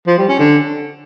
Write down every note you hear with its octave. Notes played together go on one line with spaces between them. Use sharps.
F3
G3
C#4
D3